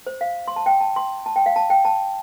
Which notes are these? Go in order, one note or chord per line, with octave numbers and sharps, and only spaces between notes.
C5
F5
C6
A5
G5
A5
C6
A5
G5
F5
A5
G5
A5